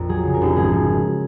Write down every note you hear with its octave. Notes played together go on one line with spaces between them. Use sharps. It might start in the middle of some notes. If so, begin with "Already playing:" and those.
Already playing: A#1 F2 A#4
F#3 G#4
C#3
A#4
F1
G#1 G#4
F3